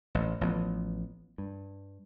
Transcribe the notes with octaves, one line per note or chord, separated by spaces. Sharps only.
A1
A1 F3 F#3 B3
G2